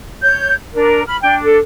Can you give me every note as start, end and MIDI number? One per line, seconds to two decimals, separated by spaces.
0.22 0.54 73
0.22 0.54 91
0.73 1.05 62
0.73 1.05 70
1.06 1.17 83
1.06 1.17 89
1.23 1.58 62
1.23 1.36 79
1.43 1.60 69